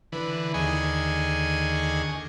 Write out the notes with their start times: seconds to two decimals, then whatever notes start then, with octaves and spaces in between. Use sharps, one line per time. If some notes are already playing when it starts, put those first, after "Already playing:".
0.12 D3 E3 B4
0.54 D#2 D3 G#4 D#5 G#5 C#6